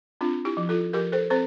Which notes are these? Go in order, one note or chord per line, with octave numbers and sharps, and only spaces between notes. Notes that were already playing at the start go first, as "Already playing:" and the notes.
C4 D4 F4
E4 G4
F3
F4 A4
F3 G4 A#4
A4 C5
C4 A4 C5